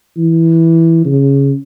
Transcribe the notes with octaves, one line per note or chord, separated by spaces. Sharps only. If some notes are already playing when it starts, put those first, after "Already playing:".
E3
C#3